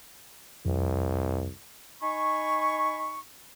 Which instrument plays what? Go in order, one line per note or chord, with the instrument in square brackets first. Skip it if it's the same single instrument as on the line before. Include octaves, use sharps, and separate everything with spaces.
[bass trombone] C2 [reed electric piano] F2
[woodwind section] D#4 G#5 B5 C#6